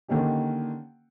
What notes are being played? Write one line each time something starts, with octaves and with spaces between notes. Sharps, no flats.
D3 D#3 A#3 C#4 D#4 G4